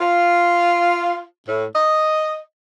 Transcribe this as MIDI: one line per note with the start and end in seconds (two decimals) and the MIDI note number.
0.01 1.23 65
1.48 1.64 45
1.75 2.41 75